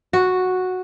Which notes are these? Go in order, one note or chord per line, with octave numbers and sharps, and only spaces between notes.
F#4